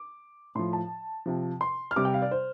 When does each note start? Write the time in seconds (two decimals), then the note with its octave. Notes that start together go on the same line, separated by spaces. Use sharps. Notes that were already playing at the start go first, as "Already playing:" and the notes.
Already playing: D6
0.55 A2 F3 C6
0.73 A5
1.26 C3 F3
1.61 C6
1.91 F6
1.96 C3 G3 D6
2.05 G5
2.14 F5
2.22 D5
2.31 C5